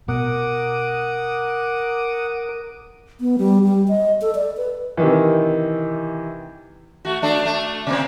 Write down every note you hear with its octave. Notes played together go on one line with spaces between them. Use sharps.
B2 A#4 F#5 D6 D#6
B3
G3
G3
D#5
A4
D5
B4
C3 D#3 E3
A3 F#4
A3 D4 A4
A3
C3 A#3 C4